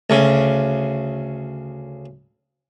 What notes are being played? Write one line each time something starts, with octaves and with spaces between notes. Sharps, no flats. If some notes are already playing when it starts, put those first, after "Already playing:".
D2 C#3